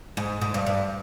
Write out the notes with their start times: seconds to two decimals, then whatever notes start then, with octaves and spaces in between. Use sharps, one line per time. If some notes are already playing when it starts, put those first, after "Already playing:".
0.17 G#2
0.41 G#2
0.54 G2
0.67 G2